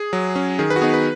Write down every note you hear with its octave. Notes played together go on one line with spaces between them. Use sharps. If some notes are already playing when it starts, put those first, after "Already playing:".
Already playing: G#4
F#3
C#4
D#3 G#4
B4
F#4
B3 D#4 G#4
B4